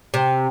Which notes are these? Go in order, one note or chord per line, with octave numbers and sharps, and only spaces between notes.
C3